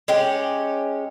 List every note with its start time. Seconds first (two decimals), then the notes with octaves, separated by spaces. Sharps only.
0.08 G#3 C#4 G4